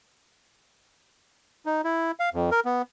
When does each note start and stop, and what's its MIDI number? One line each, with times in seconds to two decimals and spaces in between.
1.66 1.81 63
1.84 2.12 64
2.19 2.29 77
2.34 2.50 41
2.52 2.60 70
2.65 2.82 59